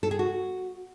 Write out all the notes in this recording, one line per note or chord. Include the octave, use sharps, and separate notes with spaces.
A4
G#4
F#4